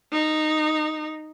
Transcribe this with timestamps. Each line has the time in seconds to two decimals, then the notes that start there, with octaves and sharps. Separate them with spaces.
0.12 D#4